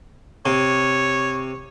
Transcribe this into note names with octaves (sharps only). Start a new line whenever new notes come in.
C3 C#5